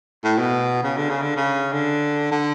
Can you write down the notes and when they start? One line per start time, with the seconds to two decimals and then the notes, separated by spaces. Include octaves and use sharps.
0.24 A2
0.39 B2
0.83 C#3
0.97 D3
1.10 C#3
1.22 D3
1.36 C#3
1.73 D3
2.31 D3